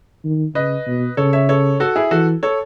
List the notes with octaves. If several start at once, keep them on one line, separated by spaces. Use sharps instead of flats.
D#3
C#3 B4 D#5
B2
C#3 A4 C#5
C#5 E5
A4 C#5
F#4 A4
E4 G#4
E3 F#4 A4
A4 C#5